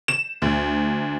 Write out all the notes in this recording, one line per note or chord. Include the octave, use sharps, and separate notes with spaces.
E7
D2